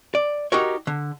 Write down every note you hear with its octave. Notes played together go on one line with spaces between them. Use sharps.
D5
D#4 F#4 G4 A#4 C#5
D3